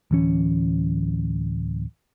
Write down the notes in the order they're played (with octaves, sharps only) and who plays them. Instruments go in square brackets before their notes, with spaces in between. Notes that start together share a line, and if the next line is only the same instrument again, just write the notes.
[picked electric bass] D1 E3 C#4